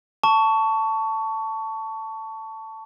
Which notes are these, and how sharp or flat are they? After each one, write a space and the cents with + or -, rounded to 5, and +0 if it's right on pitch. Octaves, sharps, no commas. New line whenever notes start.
A5 +10 C#6 +20